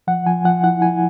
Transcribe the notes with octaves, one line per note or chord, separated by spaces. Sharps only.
F3 F#5
F3 G#5
F3 F#5
E4 F#5
E4 G#5